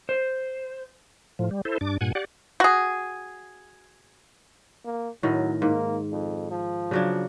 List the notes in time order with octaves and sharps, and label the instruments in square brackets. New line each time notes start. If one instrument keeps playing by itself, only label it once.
[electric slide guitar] C5
[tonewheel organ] A2 F3
G3
E4 A4 C5
G2 D4 D6
G2 A#2 F#5 G#5
G4 D5 F#5
[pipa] F#4 G#4
[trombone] A#3
[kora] A2 D#3 [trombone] F#3
[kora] G#2 [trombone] A#3
[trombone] F2
F3
[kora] C#3 F#3 D4